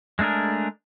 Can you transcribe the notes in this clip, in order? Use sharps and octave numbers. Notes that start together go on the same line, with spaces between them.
G#3 A3 D4 G#4 A#4